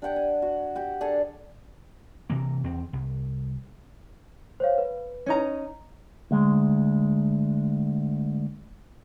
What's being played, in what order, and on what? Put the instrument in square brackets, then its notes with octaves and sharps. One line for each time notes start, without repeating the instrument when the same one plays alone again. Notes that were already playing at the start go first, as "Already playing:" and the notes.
[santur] D4 G4 F#5 G5
G#5
F#4
F#4 G4 F#5
D4 G#4 A4 F#5
[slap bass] C3 E3 A#3
E2 C4
C2
[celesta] C5 C#5 F5
B4
[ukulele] C#4 D#4 A#5
[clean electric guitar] D2 G#3